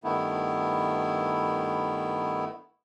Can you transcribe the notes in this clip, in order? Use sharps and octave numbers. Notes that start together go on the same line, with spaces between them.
G2 D#3 A3 B3 E4